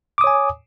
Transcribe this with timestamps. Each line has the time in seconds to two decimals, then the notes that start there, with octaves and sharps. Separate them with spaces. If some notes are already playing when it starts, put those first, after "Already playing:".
0.18 D6
0.21 D#6
0.24 C#5
0.27 G#5